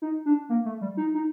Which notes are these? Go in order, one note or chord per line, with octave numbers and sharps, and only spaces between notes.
D#4
D4
A#3
A3
G3
D#4
D#4